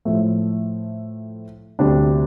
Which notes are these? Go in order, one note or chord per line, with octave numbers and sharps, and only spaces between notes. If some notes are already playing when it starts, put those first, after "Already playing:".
A2 F3 A3
D2 C3 G3 D4 G4